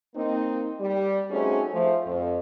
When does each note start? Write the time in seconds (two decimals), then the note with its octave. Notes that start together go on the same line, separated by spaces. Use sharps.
0.15 A#3 C4 D#4
0.80 G3
1.30 A3 C4 C#4 D#4 F#4 G#4
1.72 F3 A3
2.06 F2